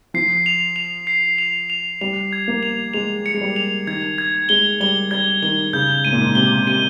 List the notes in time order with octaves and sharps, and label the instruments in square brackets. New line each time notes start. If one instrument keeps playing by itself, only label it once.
[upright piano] F3 [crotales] C7
[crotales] F7
F7
C7
F7
F7
[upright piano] G3 [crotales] F7
[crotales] G#6
[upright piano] A#3
[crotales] F7
[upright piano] G#3 [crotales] F7
[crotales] C#7
[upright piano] G#3
G3
[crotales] F7
[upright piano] D#3 [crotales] G#6
[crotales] G#6
[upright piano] G#3 [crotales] G7
[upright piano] G3 [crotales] G7
[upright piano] G3 [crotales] G#6
[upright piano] D#3 [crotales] G7
[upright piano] C#3 [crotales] G6
[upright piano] G#2 [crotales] D#7
[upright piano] A#2
G#2
[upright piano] C3 [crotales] G7
[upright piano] C3 [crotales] D#7